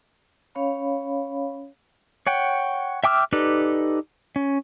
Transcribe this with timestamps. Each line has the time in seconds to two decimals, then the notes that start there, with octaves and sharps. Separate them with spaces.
0.55 C#4 C#5 F5 B5
2.27 C#5 F#5 G5
3.04 E5 G5 D6 E6 F6
3.33 D#4 G4 A4 B4 D5
4.36 C#4